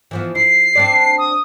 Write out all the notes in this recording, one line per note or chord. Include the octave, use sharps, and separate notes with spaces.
E3 F3 B3
E4 C7
C4 D4 D5
D#6